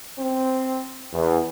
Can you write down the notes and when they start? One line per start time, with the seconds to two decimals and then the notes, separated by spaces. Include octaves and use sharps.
0.19 C4
1.12 E2